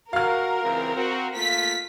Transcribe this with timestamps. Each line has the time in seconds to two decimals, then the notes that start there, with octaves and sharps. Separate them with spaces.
0.13 F#4 A#4 F5 F6
0.62 C#2 E3 C4
0.95 C4 F#4
1.36 A3 A#3 F4 B6